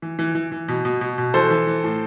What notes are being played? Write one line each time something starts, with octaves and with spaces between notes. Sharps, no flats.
E3
E3
E3
E3
B2
B2
B2
B2
E3 A4 C5
E3
E3
A2